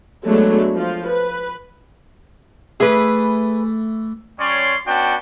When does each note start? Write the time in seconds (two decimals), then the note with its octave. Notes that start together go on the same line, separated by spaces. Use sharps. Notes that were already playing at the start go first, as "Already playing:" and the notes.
0.25 F#3 G#3 A3 B3 D4
0.75 F3 F4
1.07 B4
2.80 E3 A3 G#4 A4 B4
4.39 G3 C#4 C#5 D5 C6
4.87 B3 C#4 D4 F#4 G5 A5